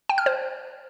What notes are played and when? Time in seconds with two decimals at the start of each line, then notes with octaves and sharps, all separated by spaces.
0.10 G5
0.18 F6
0.26 C5